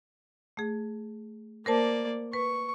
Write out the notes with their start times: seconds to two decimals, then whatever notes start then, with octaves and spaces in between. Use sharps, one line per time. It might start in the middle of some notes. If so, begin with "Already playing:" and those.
0.57 A3 G#4
1.66 A#3 A#4 C5 D5 A5
2.33 B4 C#6